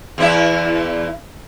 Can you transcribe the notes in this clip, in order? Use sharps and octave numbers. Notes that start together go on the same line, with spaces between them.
E2 E4 E5